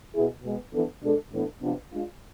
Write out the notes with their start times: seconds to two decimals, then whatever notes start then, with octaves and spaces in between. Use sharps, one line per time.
0.14 B2 B3 E4 G#4
0.43 B2 G#3 B3
0.73 E3 B3 D4 A4
1.02 B2 G#3 D4 A4
1.32 A2 E3 B3 D4 A4
1.61 C3 F3 B3 D4 F4
1.91 G#3 D4 F4